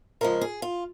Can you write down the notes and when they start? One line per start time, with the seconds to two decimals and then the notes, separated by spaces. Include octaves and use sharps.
0.21 C#3 F3 G#3 A#4
0.41 G#4
0.62 F4